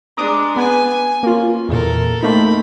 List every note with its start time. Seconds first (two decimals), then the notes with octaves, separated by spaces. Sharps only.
0.17 G#3 D4 A#5 D6 D#6
0.56 B3 B4 G#5
0.89 G#5
1.23 A#3 C#4 F4
1.69 E2 A#2 A4 A#4
2.23 A3 A#3 C4 D#4 B5